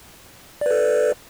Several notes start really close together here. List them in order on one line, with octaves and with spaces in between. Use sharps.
D5 B4 A4